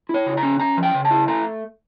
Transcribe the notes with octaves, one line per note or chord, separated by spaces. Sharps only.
E4 C#5
C#3
A#5
C#4
C#4 A#5
F3
G5
C#3
A5
E4
A3 A#5